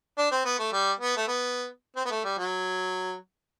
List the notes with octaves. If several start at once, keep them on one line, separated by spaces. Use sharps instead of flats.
D4
C4
B3
A3
G3
B3
A3
B3
C4
B3
A3
G3
F#3